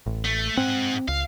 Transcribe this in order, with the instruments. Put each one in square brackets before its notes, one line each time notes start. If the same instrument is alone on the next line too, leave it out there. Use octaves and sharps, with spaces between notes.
[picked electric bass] A1
[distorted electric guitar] A3
[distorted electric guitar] G#2 F#5 [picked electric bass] C4
[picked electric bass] C#2 [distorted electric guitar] F5